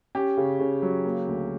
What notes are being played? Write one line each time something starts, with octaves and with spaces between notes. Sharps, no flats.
C#4 G4
C#3
C#3
F#3
A#3
D2